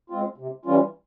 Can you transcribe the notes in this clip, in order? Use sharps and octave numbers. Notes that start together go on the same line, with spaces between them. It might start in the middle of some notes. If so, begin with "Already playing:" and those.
G#3 C4 F4
C3
E3 G3 C#4 F4